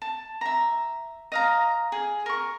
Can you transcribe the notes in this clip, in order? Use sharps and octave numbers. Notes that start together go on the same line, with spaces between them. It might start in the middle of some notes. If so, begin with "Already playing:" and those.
A5
E5 A#5
D#5 F5 A#5
G#4
A#4 C#6